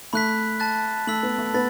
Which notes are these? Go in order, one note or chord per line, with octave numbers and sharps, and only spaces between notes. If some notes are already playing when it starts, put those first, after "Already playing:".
A3 B5 F#6 B6
A5 F#6 A6
A3 E6 B6 F#7
B3
A3
B3 B5 A6